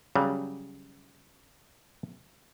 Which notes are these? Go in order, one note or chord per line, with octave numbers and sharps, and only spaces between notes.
C#3 F#3 G3